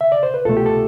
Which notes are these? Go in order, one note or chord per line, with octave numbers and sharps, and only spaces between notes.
E5
D5
C5
B4
C2 B2 A3 F4 A4
G4
A4